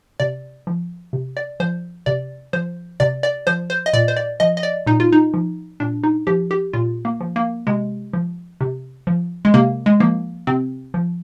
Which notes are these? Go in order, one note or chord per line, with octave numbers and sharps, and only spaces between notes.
C3 D5
F3
C3
D5
F3 C5
C3 D5
F3 C5
C3 D5
D5
F3 C5
C5
D#5
A#2 D5
C5
D5
F3 D#5
D#5
D5
A#2 D#4
F4
D#4
F3
A#2 D4
D#4
F3 G4
G4
A#2 F4
A#3
F3
A#3
C3 G#3
F3
C3
F3
G#3
C3 A#3
G#3
F3 A#3
C3 C4
F3